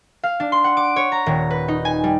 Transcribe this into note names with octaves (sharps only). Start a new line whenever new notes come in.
F5
D4
C6
F#5
D6
C#5
A#5
D#1
B4
D#4
G#5
G3